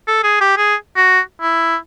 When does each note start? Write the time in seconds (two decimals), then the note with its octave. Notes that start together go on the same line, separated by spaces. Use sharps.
0.07 A4
0.23 G#4
0.41 G4
0.57 G#4
0.96 F#4
1.41 E4